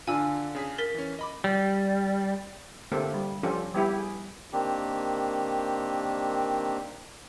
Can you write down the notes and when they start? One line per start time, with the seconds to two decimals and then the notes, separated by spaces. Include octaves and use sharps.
0.07 D3 D4 F4 G#5 E6
0.55 C#3 G#4 B6
0.78 A#4 A6 B6
0.94 E3 C#4
1.19 D#5 B5 D6
1.44 G3
2.92 D3 A3 A#3 C4 G4 A4
3.14 G3
3.43 F3 C#4 D4 F4 G4 A4
3.74 G3 B3 E4 G4
3.98 G#4
4.53 D#3 A#3 C4 D4 G4